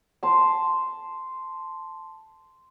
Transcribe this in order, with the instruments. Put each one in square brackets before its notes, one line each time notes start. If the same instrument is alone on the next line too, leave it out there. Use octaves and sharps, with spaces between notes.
[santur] A5 C6